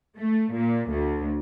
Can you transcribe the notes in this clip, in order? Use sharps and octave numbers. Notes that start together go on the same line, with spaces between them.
A3
A#2
D2